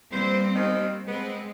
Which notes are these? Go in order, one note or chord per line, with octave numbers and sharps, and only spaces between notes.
E3 G3 A#3 C4 C5
D#2 D#3
G#3 B3 C4